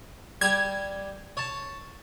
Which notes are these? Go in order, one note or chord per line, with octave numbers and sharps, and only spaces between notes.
G3 G4 G#6
C#5 A5